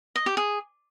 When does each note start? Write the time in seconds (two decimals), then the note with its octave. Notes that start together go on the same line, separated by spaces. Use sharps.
0.16 D#5
0.26 G4
0.37 G#4